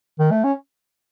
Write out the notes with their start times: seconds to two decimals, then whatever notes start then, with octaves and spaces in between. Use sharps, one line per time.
0.19 D#3
0.31 A3
0.44 C#4